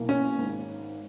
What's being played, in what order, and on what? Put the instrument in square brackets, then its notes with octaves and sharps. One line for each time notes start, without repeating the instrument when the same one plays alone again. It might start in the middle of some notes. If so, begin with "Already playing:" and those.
Already playing: [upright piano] B1 B2 A#3 E4 A#4
[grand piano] C#4
[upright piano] G#1 G#2 D#3